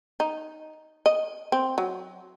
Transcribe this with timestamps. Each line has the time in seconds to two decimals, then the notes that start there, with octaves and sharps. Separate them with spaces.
0.20 D#4
1.06 D#5
1.52 C4
1.78 F#3